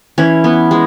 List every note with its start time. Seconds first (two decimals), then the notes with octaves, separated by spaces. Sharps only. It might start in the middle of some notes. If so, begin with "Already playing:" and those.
0.18 E3 C#4
0.44 B3
0.71 G#3